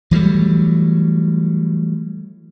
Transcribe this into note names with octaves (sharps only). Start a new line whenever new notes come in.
E3 F#3 G3 A3